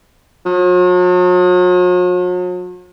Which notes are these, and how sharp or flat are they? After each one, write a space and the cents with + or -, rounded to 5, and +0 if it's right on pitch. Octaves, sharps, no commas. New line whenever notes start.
F#3 -45